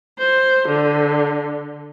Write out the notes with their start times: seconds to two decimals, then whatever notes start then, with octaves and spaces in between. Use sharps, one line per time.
0.19 C5
0.68 D3